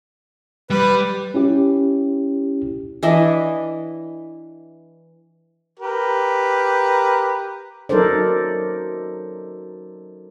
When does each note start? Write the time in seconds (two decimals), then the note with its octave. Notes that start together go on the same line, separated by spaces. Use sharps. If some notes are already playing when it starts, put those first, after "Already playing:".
0.70 G3 B4
1.34 C#4 E4 G4
3.03 E3 D4 D#5 E5
5.80 G4 A#4 B4
7.89 F#3 D#4 A4 A#4 C5 D5